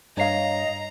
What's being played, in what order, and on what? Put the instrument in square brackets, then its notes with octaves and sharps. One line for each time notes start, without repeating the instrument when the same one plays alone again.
[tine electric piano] G2 C7 [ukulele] C#5 F5 [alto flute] D#5 [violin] A#5